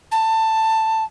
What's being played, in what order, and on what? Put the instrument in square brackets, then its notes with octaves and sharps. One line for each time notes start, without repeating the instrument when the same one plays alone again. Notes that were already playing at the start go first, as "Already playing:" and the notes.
[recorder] A5